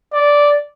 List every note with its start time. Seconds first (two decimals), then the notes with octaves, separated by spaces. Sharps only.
0.14 D5